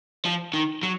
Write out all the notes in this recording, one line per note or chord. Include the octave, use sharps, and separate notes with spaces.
F3
D#3
F#3